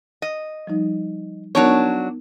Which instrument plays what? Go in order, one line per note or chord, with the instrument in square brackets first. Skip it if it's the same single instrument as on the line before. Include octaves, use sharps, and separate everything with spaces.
[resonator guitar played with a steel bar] D#5
[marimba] F3 G3 D#4
[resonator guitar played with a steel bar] F#3 D4 C#5 [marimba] B3 D#4 A#4